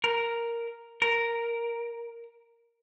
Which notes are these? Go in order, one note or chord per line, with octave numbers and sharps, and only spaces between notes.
A#4
A#4